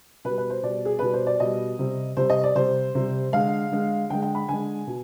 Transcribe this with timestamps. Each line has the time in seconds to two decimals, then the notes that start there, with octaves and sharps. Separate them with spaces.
0.25 B2 G3 B4
0.38 B4
0.50 C5
0.63 B2 G3 D5
0.85 G#4
0.99 B2 G3 B4
1.14 C5
1.27 D5
1.40 B2 G3 D#5
1.79 C3 G3
2.17 C3 G3 C5
2.30 D#5
2.44 D5
2.55 C3 G3 C5
2.95 C3 G3
3.32 D3 G#3 F5
3.71 D3 G#3
4.10 D3 G#3 G5
4.22 G5
4.35 B5
4.49 D3 G#3 G#5
4.87 B2